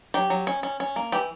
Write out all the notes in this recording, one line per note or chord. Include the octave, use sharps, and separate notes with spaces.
F#3 G4
F#3
C#4
C#4
C#4
A#3
E3 G4